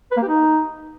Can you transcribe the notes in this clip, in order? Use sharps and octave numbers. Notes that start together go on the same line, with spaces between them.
B4
A#3
G4
D#4